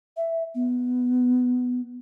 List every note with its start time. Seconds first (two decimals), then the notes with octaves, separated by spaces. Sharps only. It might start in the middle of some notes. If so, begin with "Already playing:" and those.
0.17 E5
0.55 B3